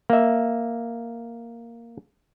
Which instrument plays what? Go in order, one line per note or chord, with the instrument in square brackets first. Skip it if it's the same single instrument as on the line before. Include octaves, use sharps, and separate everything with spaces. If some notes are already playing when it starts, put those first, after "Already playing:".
[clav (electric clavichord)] A#3 E5